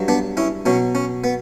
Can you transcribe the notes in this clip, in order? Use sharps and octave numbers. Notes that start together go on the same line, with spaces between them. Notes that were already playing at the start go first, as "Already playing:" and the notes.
Already playing: G2 F#3
B3 D4
C#4 E4
B2 F#3 C#4
C#4
B3